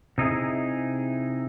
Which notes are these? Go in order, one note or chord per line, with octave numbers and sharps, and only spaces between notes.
C3 D#4 E4 G#4